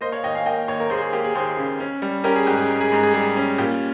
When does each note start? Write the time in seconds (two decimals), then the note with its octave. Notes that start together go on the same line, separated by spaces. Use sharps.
0.01 A#3 C5 D#5
0.12 C#5 F5
0.23 D#2 D#5 G5
0.34 F5 G#5
0.46 A#3 D#5 G5
0.67 D#2 C#5 F5
0.80 A#4
0.90 D#2 G#4 C5
1.01 G#4
1.13 A#3 G4
1.24 G#4
1.35 D#2 G#4 C5
1.57 C#3
1.80 C#4
2.02 G3
2.24 C#4 G4 A#4
2.36 G#4
2.47 G#2 G4
2.57 G#4
2.70 G#2
2.81 G#4
2.91 G#2 G#4
3.03 G#4
3.14 G3 G#4
3.37 C#4
3.58 A#2 G4